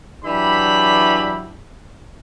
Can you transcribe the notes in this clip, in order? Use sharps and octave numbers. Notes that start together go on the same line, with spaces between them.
E3 F#3 D4 E4 G4 B5